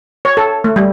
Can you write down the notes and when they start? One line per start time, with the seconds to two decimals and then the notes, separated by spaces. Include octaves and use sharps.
0.25 C#5
0.37 A4
0.64 A3
0.76 G3